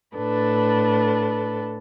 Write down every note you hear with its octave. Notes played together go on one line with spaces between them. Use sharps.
A2 D4 A4 B4